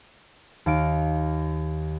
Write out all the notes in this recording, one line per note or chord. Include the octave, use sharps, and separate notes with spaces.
D#2 F5 D7